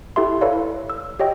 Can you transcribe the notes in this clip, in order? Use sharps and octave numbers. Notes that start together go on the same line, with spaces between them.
E4 G4 A4 E5 C6
E4 A4 B4 C#5 D5 F5
E6
G4 C#5 D#5 G5